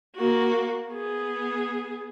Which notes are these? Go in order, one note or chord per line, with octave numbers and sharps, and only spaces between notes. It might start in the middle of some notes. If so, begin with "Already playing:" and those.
A#3 F#4
B3 G#4